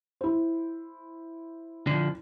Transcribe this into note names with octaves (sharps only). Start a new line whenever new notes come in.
E4 C5
D3 F3